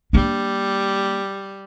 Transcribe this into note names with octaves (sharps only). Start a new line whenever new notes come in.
G3 A#3 D4